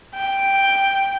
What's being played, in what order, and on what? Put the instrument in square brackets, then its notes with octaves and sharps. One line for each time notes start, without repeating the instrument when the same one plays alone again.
[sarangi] G5